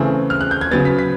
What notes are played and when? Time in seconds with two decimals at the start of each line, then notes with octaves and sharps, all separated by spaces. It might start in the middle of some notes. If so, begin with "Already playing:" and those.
Already playing: C#3 E3 A3 C4
0.30 F6
0.41 F#6
0.51 G6
0.61 G#6
0.71 C#3 F#3 B3 A6
0.85 B6
0.99 B6